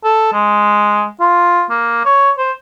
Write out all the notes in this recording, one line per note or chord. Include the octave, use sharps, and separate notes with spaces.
A4
G#3
F4
A#3
C#5
C5